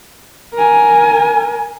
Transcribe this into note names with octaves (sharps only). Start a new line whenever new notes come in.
A#4 G#5